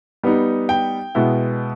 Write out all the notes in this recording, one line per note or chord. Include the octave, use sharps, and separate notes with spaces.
G3 B3 D#4
G5
B2 G#3 B3 E4